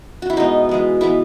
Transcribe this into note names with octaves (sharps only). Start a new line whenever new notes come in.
F#4
E4
B2 G#3 B3 D#4
E3 G#3 B3
E3 G#3 B3 E4